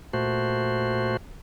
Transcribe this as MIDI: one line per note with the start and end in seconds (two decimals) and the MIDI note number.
0.13 1.17 46
0.13 1.17 57
0.13 1.17 66
0.13 1.17 72